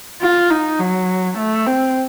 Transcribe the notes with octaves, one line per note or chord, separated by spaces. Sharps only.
F4
D#4
F#3
A3
C4